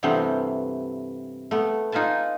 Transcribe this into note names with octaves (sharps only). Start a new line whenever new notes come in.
G2 C3 E3 A3 B3 C4
A3 B3
D#4 F4 B4 G#5 A5